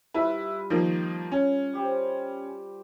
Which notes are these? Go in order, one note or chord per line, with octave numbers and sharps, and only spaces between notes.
G2 E4 F4 B4
D#3 F3 A#3
C#4
G3 G4 C5